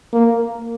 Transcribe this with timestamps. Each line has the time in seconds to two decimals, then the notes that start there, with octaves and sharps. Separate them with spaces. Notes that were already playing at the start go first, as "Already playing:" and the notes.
0.13 A#3